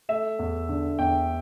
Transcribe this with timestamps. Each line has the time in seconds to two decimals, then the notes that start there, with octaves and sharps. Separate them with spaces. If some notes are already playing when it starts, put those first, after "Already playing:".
0.09 A3 E5
0.39 E2
0.69 D3
0.99 E2 G5